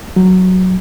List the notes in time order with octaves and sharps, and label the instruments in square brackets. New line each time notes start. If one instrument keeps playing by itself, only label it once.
[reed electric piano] F#3